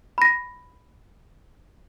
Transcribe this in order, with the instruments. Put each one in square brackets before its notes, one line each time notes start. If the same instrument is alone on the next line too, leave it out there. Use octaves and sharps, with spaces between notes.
[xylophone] B5 A#6